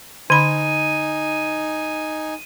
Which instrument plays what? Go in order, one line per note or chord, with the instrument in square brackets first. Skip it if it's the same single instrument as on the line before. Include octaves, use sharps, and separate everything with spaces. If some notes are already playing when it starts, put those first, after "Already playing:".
[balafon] D3 B5 [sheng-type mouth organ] D#4 G#5 [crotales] D#7